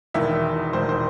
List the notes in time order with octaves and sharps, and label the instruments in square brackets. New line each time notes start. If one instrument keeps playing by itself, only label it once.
[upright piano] E1 E2 D#3 E5
E1 E2 D#3 C5
C5